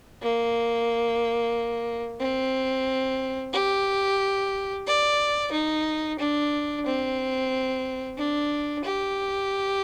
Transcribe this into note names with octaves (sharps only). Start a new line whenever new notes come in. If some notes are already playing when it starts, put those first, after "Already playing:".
A#3
C4
G4
D5
D#4
D4
C4
D4
G4